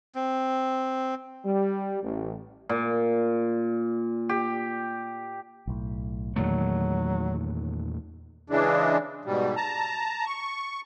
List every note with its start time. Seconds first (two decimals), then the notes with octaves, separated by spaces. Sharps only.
0.15 C4
1.45 G3
2.03 A1
2.69 A#2
4.29 G4
5.67 B1 A2
6.36 E2 A#2 D#3 F#3 A3
8.50 C#3 E3 G#3 D4
9.25 G#2 B2 G3
9.56 A5 A#5
10.26 C#6